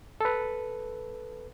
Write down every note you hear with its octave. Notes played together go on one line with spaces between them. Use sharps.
A4 B4